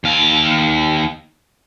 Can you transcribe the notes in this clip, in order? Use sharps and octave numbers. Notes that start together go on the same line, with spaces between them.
D#2 F5